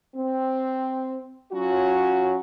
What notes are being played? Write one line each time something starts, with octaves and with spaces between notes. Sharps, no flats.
C4
F#3 C#4 F4 F#4